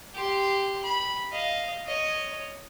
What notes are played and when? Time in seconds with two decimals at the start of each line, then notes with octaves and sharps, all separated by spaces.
0.14 G4 C6
0.83 B5
1.32 D#5 F5
1.86 C#5 D#5